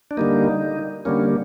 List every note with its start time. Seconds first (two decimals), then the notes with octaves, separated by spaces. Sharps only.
0.11 D4
0.17 D3 G3 A#3 D#4
1.05 D3 G3 A#3 C#4